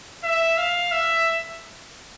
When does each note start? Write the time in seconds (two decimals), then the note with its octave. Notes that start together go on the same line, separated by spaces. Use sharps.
0.24 E5
0.58 F5
0.92 E5